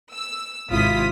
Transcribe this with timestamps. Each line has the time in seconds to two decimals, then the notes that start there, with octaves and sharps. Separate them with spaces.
0.12 E6
0.70 G#1 C3 E4 F4 D#6 B6